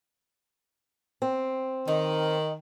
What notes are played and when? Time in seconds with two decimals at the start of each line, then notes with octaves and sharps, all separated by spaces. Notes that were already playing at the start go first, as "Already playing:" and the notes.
1.22 C4
1.88 D#3 D#4